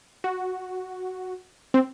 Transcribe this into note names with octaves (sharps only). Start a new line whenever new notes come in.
F#4
C4